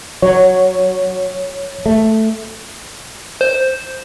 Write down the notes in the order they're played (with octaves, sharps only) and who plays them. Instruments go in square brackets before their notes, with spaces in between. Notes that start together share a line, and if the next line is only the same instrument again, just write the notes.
[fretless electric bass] F#3 [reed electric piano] C#5
[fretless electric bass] A3
[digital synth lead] C5